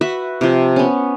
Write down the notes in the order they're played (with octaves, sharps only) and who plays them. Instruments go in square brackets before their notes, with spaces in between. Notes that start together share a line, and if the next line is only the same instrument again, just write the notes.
[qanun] F#4 B4 E5
C3 F3
B3 C#4